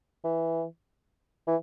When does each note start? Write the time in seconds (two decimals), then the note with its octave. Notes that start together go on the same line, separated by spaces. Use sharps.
0.24 E3
1.47 E3